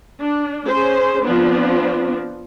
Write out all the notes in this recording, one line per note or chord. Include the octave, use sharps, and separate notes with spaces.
D4
C#4 G#4 C5
F3 B3 C4 D4